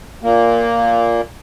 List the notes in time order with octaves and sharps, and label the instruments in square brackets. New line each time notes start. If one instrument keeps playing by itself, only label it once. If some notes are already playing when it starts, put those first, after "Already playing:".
[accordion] A#2 A#3